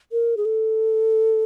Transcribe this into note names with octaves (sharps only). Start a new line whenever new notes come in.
A#4
G#4
A4